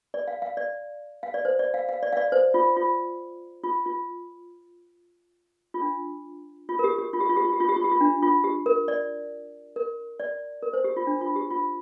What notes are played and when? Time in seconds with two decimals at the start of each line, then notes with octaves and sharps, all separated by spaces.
0.14 D5
0.28 F5
0.42 F5
0.57 D5
1.23 F5
1.34 D5
1.45 C5
1.59 D5
1.74 F5
1.89 F5
2.03 D5
2.13 F5
2.17 D5
2.32 C5
2.54 F4
2.76 F4
3.64 F4
3.86 F4
5.74 F4
5.81 D4
6.69 F4
6.79 A#4
6.84 G4
6.98 G4
7.13 F4
7.20 G4
7.29 F4
7.36 G4
7.45 F4
7.53 G4
7.60 F4
7.69 G4
7.76 F4
7.84 G4
7.91 F4
8.01 D4
8.22 F4
8.44 G4
8.66 A#4
8.88 D5
9.76 A#4
10.20 D5
10.62 A#4
10.73 C5
10.84 G4
10.97 F4
11.07 D4
11.21 F4
11.36 G4
11.50 F4